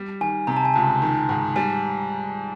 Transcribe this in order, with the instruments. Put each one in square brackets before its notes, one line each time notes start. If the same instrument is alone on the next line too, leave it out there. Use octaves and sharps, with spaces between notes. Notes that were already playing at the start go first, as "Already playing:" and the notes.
Already playing: [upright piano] G3
[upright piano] D#3 [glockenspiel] G#5
[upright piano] C3 [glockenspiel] A#5
[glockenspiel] A5
G#5
[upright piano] C#2 [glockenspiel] A5
[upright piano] D#3
G#2
[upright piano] G3 [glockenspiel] G#5